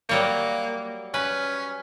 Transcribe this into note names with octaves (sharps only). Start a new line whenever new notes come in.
F#3 G3 A#3 C#5
C#4 B4